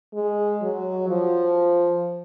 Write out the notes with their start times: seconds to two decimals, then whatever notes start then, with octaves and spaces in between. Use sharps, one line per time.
0.14 G#3
0.62 F#3
1.08 F3